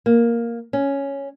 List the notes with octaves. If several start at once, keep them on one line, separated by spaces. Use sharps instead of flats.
A#3
C#4